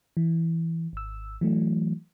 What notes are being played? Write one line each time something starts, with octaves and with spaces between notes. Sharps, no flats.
E3
G#1 E6
E3 F#3 A3